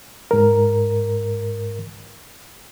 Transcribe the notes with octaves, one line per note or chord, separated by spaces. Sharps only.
G#2 A#4